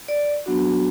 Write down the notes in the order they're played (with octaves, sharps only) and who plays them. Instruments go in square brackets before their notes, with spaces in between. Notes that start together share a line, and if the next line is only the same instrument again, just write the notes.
[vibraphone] D5
F#3 B3 D4 F#4